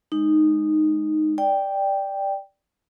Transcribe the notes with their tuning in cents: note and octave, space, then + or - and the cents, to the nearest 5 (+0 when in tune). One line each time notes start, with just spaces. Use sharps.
G#3 +0 D#4 -10
D5 +0 G5 +0